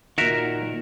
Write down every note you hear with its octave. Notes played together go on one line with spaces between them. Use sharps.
A#2 D#3 F#4 A#4 E5